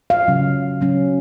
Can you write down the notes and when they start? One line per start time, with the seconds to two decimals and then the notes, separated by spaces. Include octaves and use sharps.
0.10 F5
0.28 C#3 F#3 C#4
0.81 C#3 F#3 C#4